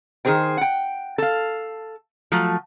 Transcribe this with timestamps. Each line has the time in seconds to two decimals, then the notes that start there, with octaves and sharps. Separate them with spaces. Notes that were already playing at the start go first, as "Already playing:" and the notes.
0.25 D#3 A3 G#4 C5 G5
0.57 F#5 G5
1.18 A4 F5
2.32 F3 F#3 A3